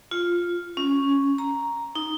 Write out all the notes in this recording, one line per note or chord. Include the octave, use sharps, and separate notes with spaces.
F4
C#4
A#5
D#4